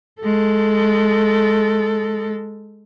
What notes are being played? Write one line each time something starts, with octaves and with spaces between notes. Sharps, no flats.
G#3 A4